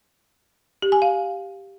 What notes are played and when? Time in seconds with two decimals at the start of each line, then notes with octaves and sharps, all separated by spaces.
0.82 G4
0.92 G#5
1.02 F5